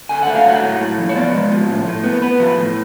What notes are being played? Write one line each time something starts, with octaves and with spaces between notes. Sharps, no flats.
D3 G#5
A3 F#5
F5
F#3 F#5
A2
A2
F3
C#5
B3 D5
G#3
F3
A2
A2
B3
B3 B4
F3
A2